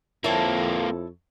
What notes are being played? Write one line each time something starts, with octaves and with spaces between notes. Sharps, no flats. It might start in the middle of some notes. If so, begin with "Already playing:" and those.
F2 A#3 C4 E4 A4 C#5